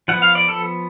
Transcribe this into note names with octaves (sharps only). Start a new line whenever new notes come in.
F3 B3 F#5
F5
D5
A4